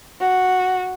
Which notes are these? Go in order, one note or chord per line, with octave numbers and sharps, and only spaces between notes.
F#4